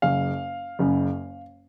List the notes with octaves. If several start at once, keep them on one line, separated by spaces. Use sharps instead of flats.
F#1 F#2 C#3 F5
F#1 F#2 C#3